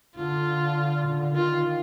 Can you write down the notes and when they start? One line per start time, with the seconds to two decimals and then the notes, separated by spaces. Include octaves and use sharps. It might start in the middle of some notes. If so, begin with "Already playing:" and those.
0.16 D3 F4
1.05 D3
1.35 D#3 F4